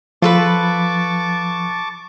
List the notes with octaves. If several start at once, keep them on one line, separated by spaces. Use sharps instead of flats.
F3 F4 A4 B4 A5 B5 C#6 D6